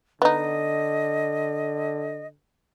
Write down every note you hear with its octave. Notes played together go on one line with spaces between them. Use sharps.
D3 B3 D#4 D#5